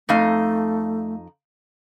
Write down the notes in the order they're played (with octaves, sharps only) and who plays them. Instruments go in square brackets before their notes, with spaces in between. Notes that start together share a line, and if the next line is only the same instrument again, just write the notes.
[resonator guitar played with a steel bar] F2 D#4 F5 [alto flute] A3